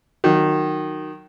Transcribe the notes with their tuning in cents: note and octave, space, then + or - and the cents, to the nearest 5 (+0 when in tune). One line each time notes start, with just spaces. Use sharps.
D#3 -15 F#3 +0